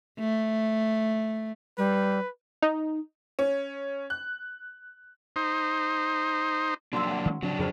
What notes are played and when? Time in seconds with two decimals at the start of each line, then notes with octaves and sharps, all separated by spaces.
0.19 A3
1.78 G3 B4
2.62 D#4
3.39 C#4
4.10 F#6
5.36 D#4 C5
6.93 F#3 A#3 D4 F#4 C6 E6
7.07 F#5 G5
7.26 D#3 G#3 C#4
7.43 C#3 F3 F#3 C4 D4
7.59 F2 C#3 F3 G#4 B4 C5